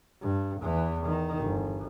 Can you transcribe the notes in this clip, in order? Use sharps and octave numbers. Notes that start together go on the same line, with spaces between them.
G2
E2 E3
D#3
G1